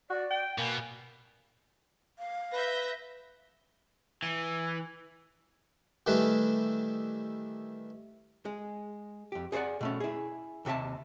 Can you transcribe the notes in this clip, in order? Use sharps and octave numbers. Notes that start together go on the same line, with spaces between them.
F#4 D5
G5
B2 A#3 G#5
F5
B4 E5 G6 A#6
E3
D#3 E3 G3 A3 E4 B4
G#3
F2 G4
G#4 A4 C5 D5 F#5
B2 A3 C#4
E4 G#4
D#2 C3 F#4 E5 A5